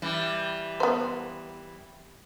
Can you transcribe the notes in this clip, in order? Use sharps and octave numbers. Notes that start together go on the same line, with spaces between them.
E3 G3
B3 C5